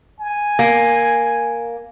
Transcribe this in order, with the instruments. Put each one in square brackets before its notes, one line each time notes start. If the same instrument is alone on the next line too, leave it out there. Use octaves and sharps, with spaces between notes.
[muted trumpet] G#5
[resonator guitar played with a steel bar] A#3